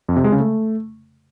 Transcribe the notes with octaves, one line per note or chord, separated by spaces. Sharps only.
F2
C3
G#3
C#3
A3